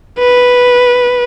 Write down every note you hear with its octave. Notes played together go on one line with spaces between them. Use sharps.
B4